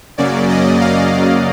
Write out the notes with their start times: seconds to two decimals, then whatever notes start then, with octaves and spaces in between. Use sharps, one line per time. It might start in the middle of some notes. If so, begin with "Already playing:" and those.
0.18 F#2 C#3 F#3 A#3 C#4 D5
0.49 D#5
0.81 F5
1.13 F5